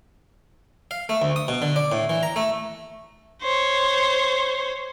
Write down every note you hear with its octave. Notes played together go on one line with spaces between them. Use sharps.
F5
A3
D2
D#6
B2
D3
D5
A2
E3
A#5
A3
C5 C#5